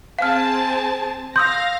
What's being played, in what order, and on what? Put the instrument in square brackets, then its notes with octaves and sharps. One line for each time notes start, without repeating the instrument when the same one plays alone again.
[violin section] C4 G#4 A5 [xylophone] F5 F6
[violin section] F5 A#6 [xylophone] C6 D#6 E6 [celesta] G6